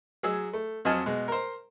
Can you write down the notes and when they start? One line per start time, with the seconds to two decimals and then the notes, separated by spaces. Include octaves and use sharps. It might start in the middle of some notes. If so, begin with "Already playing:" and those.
0.23 F#3 G#4 E6
0.53 A3
0.85 F2 F#3 D#5 G#5 A5 F6
1.06 B2 G#3
1.28 A#4 C5